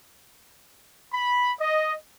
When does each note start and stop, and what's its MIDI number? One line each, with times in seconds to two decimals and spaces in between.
1.13 1.52 83
1.60 1.94 75